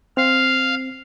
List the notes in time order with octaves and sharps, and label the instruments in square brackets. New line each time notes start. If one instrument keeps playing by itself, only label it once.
[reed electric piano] C4 [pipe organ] F5